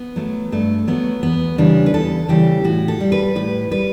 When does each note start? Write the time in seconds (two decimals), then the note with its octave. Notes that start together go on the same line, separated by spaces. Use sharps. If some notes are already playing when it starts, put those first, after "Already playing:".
Already playing: B3
0.16 F#3 A3
0.52 G2 A3
0.87 F#3 A3 B3
1.23 E2 B3
1.58 C#3 E3 G3 D4
1.86 B4
1.94 E2 A4
2.29 C#3 E3 G3 G4
2.64 A2 F#4
2.88 A4
3.01 G3
3.12 B4
3.35 A2 B4
3.71 G3 B4